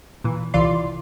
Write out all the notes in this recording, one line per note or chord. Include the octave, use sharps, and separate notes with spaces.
A#2 E3
C2 E3 F4 D5 C6